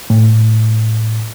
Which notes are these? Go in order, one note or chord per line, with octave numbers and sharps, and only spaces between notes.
A2